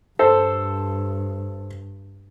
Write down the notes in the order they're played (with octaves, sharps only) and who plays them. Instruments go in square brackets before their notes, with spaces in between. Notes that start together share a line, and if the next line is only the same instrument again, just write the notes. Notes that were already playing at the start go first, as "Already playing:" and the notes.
[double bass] G2 [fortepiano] A4 C5